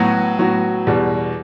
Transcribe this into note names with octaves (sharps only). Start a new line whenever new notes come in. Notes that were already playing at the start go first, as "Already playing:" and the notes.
Already playing: A2 F#3 B3 F#4
A2 F#3 B3 F#4
E2 B2 G3